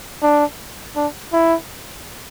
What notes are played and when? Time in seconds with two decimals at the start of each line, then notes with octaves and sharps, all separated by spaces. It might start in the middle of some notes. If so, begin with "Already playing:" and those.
0.23 D4
0.96 D4
1.33 E4